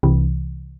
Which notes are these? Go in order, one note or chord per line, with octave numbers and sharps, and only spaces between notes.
C2 C3 E3